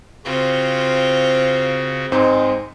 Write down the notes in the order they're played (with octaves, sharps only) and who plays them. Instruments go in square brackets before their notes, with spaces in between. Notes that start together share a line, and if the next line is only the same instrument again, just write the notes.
[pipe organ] C#3 F#4 [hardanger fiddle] C4 F4
[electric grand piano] G#2 C4 D#4 [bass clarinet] G#3